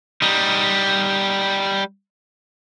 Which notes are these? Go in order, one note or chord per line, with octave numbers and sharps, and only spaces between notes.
G3 D#4